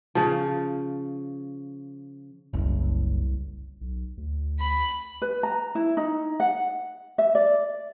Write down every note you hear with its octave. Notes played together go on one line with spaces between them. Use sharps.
C#3 F3
F#1 C2
B1
D2
B5
B4
A#5
E4
D#4
F#5
E5
D5